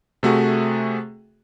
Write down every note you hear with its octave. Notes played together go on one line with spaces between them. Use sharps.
C3 A3 F#4 G#4